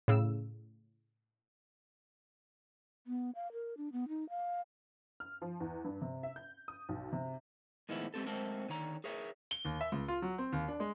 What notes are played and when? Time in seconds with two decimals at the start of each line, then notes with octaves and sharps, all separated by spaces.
0.08 A2 C#3 E6
3.07 B3
3.35 F5
3.52 A#4
3.77 D4
3.92 B3
4.09 D#4
4.30 F5
5.20 F6
5.42 F3
5.60 E2
5.84 G2
6.01 C3
6.23 E5
6.36 G6
6.68 D#6
6.89 B1
7.13 C3
7.89 A2 D#3 F3 G#3 B3 E4
8.14 G#3 A3 C4 G4 A4
8.27 F#3 G#3 A3 C4 A4 A#4
8.69 D3 D#3 C#5 A#5
9.04 G#4 A#4 C#5 E5
9.51 G7
9.65 D#2
9.81 E5
9.92 C#2
10.08 F4
10.22 F#3
10.38 C4
10.53 D#2
10.68 D4
10.80 G#3